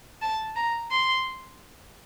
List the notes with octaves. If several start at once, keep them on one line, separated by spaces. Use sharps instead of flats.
A5
A#5
C6